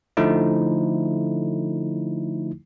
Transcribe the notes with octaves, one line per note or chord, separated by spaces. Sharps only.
D3 F3 A3 D#4 E4